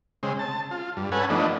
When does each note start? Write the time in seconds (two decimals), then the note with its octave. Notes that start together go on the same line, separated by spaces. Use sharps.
0.23 C#3 G#3 C4
0.39 A5
0.71 F4
0.97 G2
1.12 C#4 A4 B4 F#5 G#5
1.30 F3 A3 B3 D4 D#4